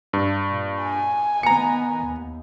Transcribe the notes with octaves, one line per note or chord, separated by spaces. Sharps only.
G2
A#2
G#5
D#3 B3 A#5 C#7
D#2